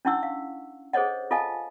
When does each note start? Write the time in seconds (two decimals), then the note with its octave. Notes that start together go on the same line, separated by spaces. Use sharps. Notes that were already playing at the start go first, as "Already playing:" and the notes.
0.05 C#4 D4 E4 F#5 C#6 E6
0.23 F5
0.93 G#4 A4 C5 C#5 D#5 F#5
1.31 F4 A4 D#5 F5 G#5 A5